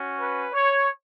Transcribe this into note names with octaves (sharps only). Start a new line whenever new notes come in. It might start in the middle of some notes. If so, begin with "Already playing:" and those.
Already playing: C#4 F#4
B4
C#5